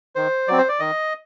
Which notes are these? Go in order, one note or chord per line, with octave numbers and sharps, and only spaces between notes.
D#3 C5
F#3 C4 D5
C5
D5
D#3 D#5